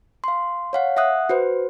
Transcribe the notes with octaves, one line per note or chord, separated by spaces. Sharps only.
F5 C6
C#5 F5 F#5
E5 F#5 D#6 F#6
F#4 B4 C5